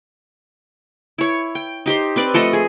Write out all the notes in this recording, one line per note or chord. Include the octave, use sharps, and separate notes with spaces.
E4 C#5
G5
D#4 G4 C5 C6
C4 B4 D5
F3 A3 A4 D#5
G#4